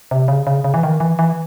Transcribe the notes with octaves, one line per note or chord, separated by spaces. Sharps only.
C3
C#3
C#3
C#3
E3
D#3
E3
E3